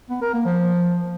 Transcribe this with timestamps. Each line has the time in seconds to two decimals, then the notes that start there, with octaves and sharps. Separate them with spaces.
0.10 B3
0.21 A#4
0.33 A#3
0.45 F3